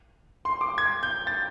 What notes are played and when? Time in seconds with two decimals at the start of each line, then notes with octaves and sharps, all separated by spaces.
0.45 C6
0.61 D6
0.78 G#6
1.03 G6
1.27 A6